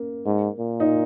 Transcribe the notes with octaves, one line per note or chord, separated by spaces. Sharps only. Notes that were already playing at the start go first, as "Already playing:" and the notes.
Already playing: A#3 C#4
G#2
A#2
D#4